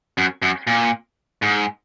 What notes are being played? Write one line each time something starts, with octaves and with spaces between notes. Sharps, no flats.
F#2
F#2
A#2
G#2